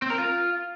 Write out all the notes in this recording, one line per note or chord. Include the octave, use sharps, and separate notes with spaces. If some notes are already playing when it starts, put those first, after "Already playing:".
C4
A#4
F4